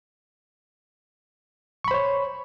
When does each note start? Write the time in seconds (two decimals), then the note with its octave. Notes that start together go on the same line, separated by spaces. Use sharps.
1.84 C#6
1.88 B5
1.91 C5
1.94 C#5